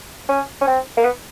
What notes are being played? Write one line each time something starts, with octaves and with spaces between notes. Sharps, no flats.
C#4
C#4
C4
A#3
B3